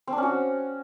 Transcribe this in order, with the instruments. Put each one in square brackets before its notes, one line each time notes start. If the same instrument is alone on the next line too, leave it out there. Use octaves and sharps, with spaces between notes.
[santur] C4
D4
C#4
F#4